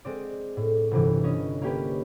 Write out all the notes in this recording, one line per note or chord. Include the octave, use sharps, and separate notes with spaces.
G#3 C4 D5
A2
G1 C3 E3
C#4 D#5
A#3 C#4 G4 B4